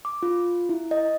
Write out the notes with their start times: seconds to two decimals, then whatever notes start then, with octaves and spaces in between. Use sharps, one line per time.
0.05 D6
0.23 F4
0.69 E4
0.91 D#5